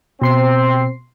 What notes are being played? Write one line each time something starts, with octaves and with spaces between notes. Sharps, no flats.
B2 C4 C6 C7